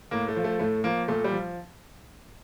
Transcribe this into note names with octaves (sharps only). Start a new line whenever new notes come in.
A2 A#3
A3
F3
A3
A2 A3
F3 A#3
A#2 A3
G3
F3